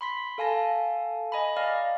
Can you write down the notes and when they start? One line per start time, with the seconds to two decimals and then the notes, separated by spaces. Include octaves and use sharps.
0.01 B5 C6 B6
0.38 A4 F5 G#5 A5 A#6
1.32 D#5 G#5 A#5 B5
1.57 D5 F5 F6 A#6